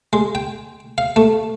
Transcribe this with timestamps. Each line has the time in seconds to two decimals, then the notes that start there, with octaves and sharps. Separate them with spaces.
0.13 G#3
0.35 G5
0.98 F5
1.16 A3